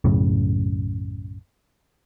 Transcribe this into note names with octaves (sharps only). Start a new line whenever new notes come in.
B1 F#2 A2 C#3